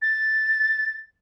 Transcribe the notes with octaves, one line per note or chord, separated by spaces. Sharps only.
A6